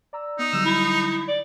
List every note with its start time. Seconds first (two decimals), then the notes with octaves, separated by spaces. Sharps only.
0.13 D5 A#5 E6
0.39 B3 D#4 D#6
0.53 D3 F#3 G3 E6
0.65 E4
1.28 D5